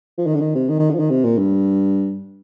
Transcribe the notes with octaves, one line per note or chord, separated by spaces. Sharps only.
F3
D#3
D3
D#3
C3
D#3
D#3
D3
F3
D#3
C3
A#2
G2